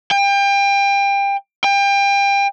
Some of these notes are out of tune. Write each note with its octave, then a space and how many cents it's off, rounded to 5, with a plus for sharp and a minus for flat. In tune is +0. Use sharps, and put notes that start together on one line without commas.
G5 +30
G5 +30